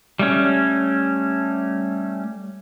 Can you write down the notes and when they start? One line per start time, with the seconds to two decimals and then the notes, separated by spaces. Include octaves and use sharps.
0.19 G3 A3 C#4